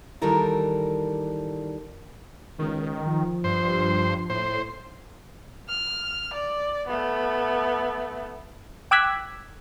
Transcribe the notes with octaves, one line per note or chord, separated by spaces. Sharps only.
D#3 E3 G3 A4 A#4 D5
C#2 D#3
F3
G2 C5
A2 C5
F6
D5
A3 B3
G5 D6 E6 F#6 G#6 B6